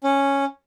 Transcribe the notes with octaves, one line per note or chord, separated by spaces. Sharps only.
C#4